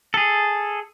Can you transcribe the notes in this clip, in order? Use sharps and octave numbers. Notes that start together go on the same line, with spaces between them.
G#4 A4